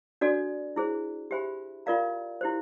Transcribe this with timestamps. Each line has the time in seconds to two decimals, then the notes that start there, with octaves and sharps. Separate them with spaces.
0.21 D4 F#4 A4 D5
0.76 E4 G#4 C5
1.31 G4 C5 E5 G#5 B5
1.86 F4 A#4 D5 F5 A#5
2.41 E4 G4 C5